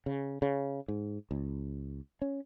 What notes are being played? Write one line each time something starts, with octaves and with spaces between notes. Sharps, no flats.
C#3
C#3
G#2
C#2
C#4